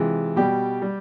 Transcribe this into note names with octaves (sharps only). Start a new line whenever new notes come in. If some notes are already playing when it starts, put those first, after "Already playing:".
Already playing: C3 E3 G#3 F4
B2 G3 G4
G3